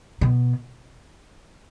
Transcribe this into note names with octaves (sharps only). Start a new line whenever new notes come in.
B2